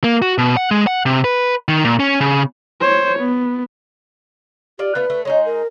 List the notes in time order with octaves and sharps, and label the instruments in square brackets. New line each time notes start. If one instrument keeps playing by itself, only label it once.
[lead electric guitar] A#3
F#4
B2
F#5
G#3
F#5
C3
B4
D#3
A#2
C#4
C#3
[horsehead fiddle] C5 C#5
B3
[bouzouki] F4 D5 [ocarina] G4
[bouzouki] A3 B3 F4 [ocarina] B4
[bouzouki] A3
[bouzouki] G#3 D#4 G#4 [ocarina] C#5
[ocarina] A#4